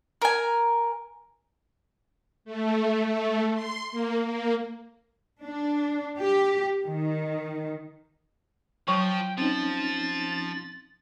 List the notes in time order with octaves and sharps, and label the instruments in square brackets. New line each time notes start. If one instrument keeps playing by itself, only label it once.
[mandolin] A#4 G#5
[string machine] A3
A3
C6
A#3
A#3
[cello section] D4
G4
D#3
[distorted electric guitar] F3 [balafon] F#3 C#6 [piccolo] G5
[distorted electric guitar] F3 [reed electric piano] C4 C#4 D#4 [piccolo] A6